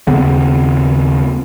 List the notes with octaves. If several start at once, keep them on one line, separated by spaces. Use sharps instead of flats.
D#2 C#3 B3 C4